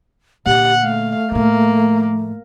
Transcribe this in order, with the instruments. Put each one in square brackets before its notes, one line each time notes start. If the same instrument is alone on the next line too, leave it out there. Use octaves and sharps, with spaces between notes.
[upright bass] A#2 D3 [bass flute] G4 [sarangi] F#5
[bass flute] A3 [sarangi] F5
[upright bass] A2 F3 [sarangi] A#3